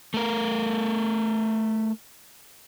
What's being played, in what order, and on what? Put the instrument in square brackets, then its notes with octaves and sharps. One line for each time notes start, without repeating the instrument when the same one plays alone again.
[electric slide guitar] A3 A#4